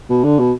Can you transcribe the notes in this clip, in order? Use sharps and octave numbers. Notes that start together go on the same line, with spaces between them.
B2
D3
B2